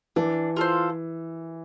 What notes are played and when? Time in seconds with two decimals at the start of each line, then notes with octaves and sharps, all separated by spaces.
0.16 E3 D4
0.56 F4 A4 C5